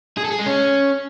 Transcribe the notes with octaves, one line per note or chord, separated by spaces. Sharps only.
G#4
A4
G#4
G#3
C#4